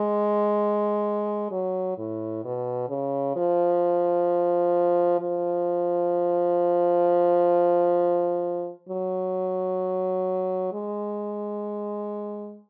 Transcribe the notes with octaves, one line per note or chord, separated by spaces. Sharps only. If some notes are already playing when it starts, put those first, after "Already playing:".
Already playing: G#3
F#3
A2
B2
C#3
F3
F3
F#3
G#3